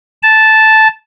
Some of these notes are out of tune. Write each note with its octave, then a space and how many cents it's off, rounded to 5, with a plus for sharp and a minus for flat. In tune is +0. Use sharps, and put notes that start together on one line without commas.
A5 -5